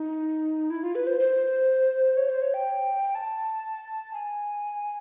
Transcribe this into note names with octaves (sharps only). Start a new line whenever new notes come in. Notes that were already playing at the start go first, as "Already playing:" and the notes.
Already playing: D#4
E4
F4
B4
C5
C5
C#5
C5
C#5
G5
A5
G#5